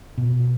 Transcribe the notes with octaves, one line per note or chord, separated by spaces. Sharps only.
B2